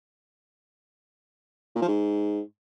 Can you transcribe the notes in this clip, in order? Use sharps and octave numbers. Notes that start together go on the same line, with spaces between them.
A#2
F3
G#2